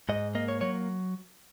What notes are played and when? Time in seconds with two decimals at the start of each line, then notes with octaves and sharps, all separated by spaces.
0.09 G#2 D#5
0.35 A#3 D#5
0.48 C#5
0.61 F#3 C#5